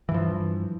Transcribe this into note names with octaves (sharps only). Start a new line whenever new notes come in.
G2 E3 F3